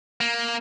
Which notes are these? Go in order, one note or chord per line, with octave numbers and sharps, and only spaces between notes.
A#3